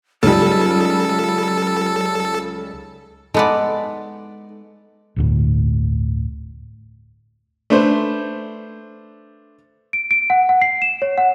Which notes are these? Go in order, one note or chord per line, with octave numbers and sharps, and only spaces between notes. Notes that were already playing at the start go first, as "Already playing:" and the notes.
C#2 C#3 F#3 G3 D#4 A4
G#3 B3 D#4 A4 D5
G1 D2 A2
A3 D4 B4 C5
D7
D7
F#5
F#5
C7
E7
C#5
F#5